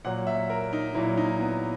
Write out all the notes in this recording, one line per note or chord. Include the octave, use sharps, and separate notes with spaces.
A#2 F#3 F#5
E5
A#4
D#4
A#2 F#3 E4
D#4
B3